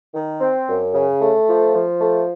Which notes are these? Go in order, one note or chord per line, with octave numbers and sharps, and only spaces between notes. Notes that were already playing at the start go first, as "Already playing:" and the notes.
D#3
C4
F#2
C#3
A3
F3
F3
A3